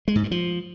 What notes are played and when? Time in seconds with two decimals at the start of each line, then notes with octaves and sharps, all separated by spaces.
0.08 G#3
0.16 G#2
0.23 G2
0.31 F3